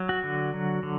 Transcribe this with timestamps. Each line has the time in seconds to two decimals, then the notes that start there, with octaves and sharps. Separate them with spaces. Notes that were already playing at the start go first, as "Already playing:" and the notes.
Already playing: F#3
0.09 F#4
0.23 D3
0.54 F#3
0.83 D3